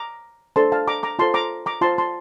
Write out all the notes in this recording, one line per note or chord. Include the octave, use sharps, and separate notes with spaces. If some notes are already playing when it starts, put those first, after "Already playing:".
Already playing: A#5 D6
D4 A4 C5 A5 C6
F5 A5
A#5 D6
A#5 D6
F4 A4 C5 A5 C6
A#5 D6
A#5 D6
F4 C5 A5 C6
A5 C6